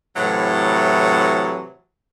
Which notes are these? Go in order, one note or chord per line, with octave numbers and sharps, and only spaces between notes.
A2 C3 E3 F#3